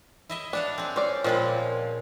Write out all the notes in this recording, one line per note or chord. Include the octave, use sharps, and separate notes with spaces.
E4 D#5 E5
D4 F5 F#5 A5
C4 G#4
C#4 C5 D5
A#2 F3 G#3 C4 F4 B5